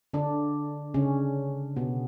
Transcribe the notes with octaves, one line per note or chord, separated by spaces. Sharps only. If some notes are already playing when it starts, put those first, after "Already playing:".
D3 D4
C#3 C#4
B2 B3